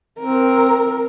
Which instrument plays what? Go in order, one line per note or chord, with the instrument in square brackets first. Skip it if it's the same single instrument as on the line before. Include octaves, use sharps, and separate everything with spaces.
[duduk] C4 [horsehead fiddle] A#4